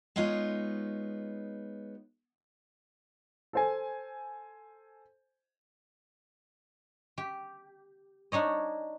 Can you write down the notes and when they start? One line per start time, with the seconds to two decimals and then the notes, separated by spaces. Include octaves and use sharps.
0.16 G#3 B3 D#4 F4 C#5
3.53 A4 C5 G#5
7.18 G4
8.32 D4 D#4 C#5 D#5